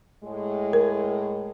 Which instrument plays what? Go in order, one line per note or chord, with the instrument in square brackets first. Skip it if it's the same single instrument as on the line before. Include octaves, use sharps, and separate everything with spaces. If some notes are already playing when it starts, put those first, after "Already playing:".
[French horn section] A2 G#3
[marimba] A#4